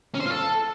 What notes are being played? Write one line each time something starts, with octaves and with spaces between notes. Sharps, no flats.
C#4
C5
F4
A4